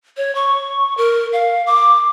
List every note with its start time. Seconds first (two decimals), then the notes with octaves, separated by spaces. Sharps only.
0.17 C#5
0.35 C#6
0.98 A#4
1.33 F5
1.67 D6